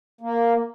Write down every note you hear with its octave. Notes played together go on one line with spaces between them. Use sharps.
A#3